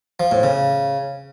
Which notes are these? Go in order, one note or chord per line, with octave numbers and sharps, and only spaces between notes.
F3
A2
C#3